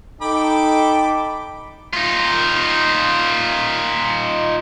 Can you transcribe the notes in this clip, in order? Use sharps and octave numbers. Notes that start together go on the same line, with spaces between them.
D#4 A4 G5 B5 D6
D#4 F4